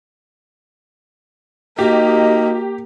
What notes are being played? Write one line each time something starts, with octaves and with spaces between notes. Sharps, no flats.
A#3 D#4 F#4 G4 D#5